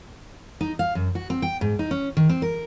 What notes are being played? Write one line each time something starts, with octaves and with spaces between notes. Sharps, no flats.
D#4
F5
F#2
F#4
C4
G5
G#2
D#4
C#4
D#3
C4
A#4